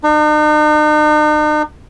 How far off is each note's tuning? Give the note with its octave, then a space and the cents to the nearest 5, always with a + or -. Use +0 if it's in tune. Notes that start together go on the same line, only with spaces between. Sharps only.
D#4 -45